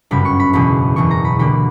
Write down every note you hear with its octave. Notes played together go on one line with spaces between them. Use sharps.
G1 F#2 C#3 G3 B5
C#6
B5
F#1 E2 B2 B5
F#1 E2 B2 C#6
A#5
B5
D2 D3 G3 A#3 B5